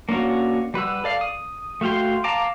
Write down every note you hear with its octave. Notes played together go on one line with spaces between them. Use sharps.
A#3 C#4 D4 F4 F#4
G3 B4 F#5 E6
A4 D5 F5
D#6
A3 F#4 F5 G5 C6
F5 A5 A#5 D6